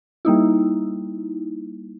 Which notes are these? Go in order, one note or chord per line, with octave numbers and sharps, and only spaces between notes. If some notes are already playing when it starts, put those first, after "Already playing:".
G3 A#3 D#4 E4